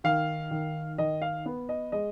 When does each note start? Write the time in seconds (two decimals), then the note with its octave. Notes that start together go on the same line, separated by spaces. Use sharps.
0.04 D#3 F5
0.51 D#3
0.98 D#3 D#5
1.22 F5
1.46 B3
1.69 D#5
1.92 G#3 D#5